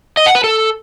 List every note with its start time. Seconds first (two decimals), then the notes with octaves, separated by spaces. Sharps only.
0.17 D#5
0.26 F#5
0.35 B4
0.44 A4